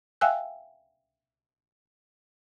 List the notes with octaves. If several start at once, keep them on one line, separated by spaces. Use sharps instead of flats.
E5 F5 G5 G#5 E6 F#6